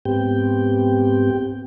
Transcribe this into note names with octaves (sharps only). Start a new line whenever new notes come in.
G#2 B3 C4 G4 G5